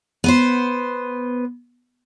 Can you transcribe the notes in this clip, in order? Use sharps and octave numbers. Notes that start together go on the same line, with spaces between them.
B3 B4 C5